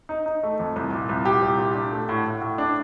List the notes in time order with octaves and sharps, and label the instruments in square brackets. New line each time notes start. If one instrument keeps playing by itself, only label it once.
[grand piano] D#4
D#4
A3
F2
C2
A#2
C2
A#2 G4
C2
A#2
D4
A3
A2
A2
A2
D4